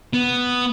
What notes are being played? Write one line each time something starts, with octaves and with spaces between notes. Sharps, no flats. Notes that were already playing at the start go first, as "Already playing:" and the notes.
B3